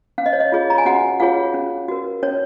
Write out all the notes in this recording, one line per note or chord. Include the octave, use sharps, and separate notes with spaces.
C#4 F5
D#5
C#5
D#5
F4 G#4 C#5
A#5
G#5
C#4 F#4 F#5
F4 G#4 C#5 F5
C#4
F#4 A#4
C#4 C#5